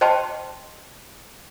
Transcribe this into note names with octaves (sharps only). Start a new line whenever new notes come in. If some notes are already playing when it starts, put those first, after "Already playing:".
C5 D#5 G5 A5 C6